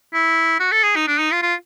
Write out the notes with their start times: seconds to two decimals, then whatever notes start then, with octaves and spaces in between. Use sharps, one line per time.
0.13 E4
0.60 F#4
0.72 A4
0.84 G#4
0.96 D#4
1.08 D4
1.19 D#4
1.32 F4
1.42 F4